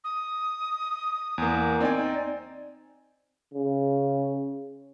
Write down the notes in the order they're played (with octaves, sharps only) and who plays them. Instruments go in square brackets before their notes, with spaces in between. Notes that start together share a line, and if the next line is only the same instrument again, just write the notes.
[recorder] D#6
[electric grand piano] E2 A#3
[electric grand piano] C4 D#4 G#5 [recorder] D5
[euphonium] C#3